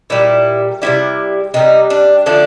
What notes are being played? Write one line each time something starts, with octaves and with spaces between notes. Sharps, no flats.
A#2 G3 E4
C3 D#3 G3 E4
C3 D#3 G3 D#4
D4
D3 F3 A3 D4